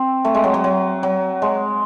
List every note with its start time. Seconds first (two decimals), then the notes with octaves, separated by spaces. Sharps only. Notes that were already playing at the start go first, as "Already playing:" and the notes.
Already playing: C4
0.25 A3
0.34 G#3
0.44 F#3
0.54 F#3
0.64 F#3
1.03 F#3
1.42 G#3